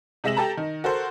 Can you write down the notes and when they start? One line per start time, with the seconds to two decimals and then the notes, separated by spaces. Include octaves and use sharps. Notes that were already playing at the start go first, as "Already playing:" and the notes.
0.24 C3 G#3 E5 A#6 E7 F#7
0.37 G4 A4 A5 A#5
0.57 D#3
0.84 F#4 A4 A#4 C5